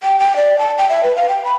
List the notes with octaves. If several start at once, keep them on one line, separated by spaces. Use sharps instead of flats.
G5
G5
D5
A5
G5
E5
B4
F5
G5
B5